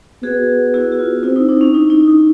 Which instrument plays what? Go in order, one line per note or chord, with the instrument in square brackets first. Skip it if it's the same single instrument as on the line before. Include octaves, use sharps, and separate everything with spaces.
[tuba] B3 [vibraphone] F#4 G#4
[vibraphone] E4 F#4
F#4
F4
[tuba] C4 [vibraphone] E4
[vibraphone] D#4
D4
C#4
D#4
D#4
D#4